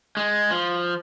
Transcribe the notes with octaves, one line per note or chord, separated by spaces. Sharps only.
G#3
F3